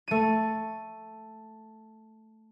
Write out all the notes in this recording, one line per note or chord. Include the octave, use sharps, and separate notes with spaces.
A3 D#7